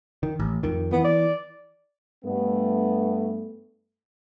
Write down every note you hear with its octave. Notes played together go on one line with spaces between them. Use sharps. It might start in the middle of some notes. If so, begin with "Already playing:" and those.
D#3
A1
F2 D#3
E3 B3
D5
G2 A3 B3